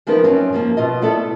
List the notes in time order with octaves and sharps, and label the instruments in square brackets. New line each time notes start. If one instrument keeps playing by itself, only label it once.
[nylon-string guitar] E3 F3 B3 D#4 A#4 B4
F#2 C4 C#4
G2 F3 A#3
B2 F4 D#5
A3 B3 E4 A4 D5